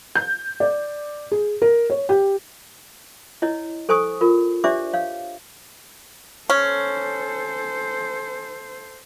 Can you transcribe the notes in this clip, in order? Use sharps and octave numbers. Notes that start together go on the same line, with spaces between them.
G6
D5
G#4
A#4
C#5
G4
E4 C#5 D#5
A4 C5 G#5 C#6 D#6
F4 A#4
D4 G4 C5 D5 E5 D6
C#5 F5
C#4 A4 C5